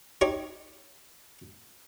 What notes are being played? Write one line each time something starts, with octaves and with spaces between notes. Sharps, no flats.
D#4 G4 C#5